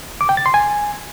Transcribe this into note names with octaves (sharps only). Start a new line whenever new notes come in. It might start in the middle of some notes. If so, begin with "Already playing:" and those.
D6
G5
A6
C6
G#5